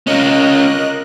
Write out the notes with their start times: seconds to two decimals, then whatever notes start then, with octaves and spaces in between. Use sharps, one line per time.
0.07 C#4 F4 A#4 D#5 F#6